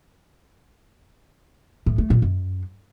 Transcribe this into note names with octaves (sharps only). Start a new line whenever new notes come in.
A2
A3
A#2
F#2